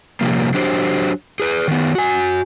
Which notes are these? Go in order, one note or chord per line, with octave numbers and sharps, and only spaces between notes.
C3 F3 G3 A#3
F#3 D4 G4 C5
G#4 B4
D#3 B3
F#4 G#5